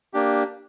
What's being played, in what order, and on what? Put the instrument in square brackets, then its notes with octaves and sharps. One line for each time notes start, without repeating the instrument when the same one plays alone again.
[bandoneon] A#3 D4 G4